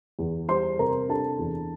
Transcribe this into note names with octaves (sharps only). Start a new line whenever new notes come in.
E2
G3 C5 C6
C3 A#4 A#5
D4 A4 A5
E2